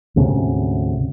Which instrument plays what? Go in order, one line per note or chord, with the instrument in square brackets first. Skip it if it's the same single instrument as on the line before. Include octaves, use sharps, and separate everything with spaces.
[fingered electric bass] D2 G#2 C3 C#4